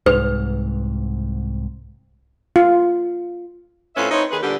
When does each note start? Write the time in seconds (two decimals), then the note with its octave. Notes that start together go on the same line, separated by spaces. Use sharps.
0.06 C2 G#2 B4
2.56 F4
3.96 F2 A2 C#4 F4 B4 E5
4.11 C4 D#4 E4 B4 C#5
4.31 D#2 D#3 G#4 B4
4.43 A#2 D3 G3 B3 D4 G4